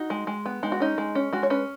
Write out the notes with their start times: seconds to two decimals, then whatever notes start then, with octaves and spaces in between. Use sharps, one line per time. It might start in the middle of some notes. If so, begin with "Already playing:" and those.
Already playing: D#4 F#4
0.10 G#3
0.27 G#3
0.46 B3
0.63 G#3 D#4
0.72 F#4
0.80 C#4 D#4
0.98 G#3
1.15 C#4
1.33 G#3 F#4
1.43 C#5
1.50 C#4 B4